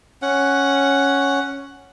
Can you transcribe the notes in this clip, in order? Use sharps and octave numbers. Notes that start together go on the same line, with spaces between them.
C#4 F#5